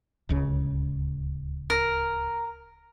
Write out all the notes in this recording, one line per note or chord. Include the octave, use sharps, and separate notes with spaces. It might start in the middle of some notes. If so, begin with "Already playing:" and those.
D1 C#2 C#3
A#4